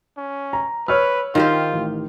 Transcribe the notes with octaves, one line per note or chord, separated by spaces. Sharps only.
C#4
A#5
B4 C#5 E6 F6
D#3 F4 G4 C5
A1